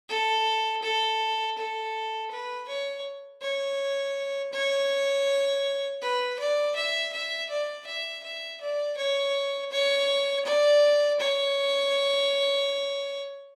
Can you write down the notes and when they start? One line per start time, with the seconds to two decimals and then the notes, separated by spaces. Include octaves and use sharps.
0.09 A4
0.82 A4
1.57 A4
2.31 B4
2.68 C#5
3.41 C#5
4.53 C#5
6.01 B4
6.39 D5
6.75 E5
7.12 E5
7.49 D5
7.86 E5
8.23 E5
8.61 D5
8.97 C#5
9.72 C#5
10.45 D5
11.20 C#5